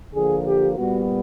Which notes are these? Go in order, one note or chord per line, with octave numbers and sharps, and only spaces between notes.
D3 F3 A#3 G#4
G4
A#2 G3 B3 F#4